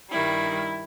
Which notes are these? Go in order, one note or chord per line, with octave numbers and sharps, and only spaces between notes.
G2 D#3 G3 E4